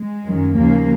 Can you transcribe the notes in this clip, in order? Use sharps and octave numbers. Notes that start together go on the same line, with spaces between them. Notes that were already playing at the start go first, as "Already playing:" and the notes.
Already playing: G#3
F#2 D#3 F#3
D#2 C#3 F3 A#3